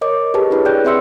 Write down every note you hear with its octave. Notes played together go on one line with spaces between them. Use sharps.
A#4 C#5 D#5 D6
G4 G#4 B4 A5
D4 E4 B4 C#5
G#4 D5 G5 F#6 G6
C4 B4 E5 C6 E6 C#7